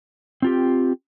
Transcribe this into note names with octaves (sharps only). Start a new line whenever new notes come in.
C4 F4 G4